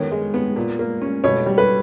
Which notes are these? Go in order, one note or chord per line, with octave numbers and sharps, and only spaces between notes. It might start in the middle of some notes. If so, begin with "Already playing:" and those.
Already playing: D#3 B3 C#5
G#3
B3
A#2
A#3
C#4
B2 C#5
G3
B4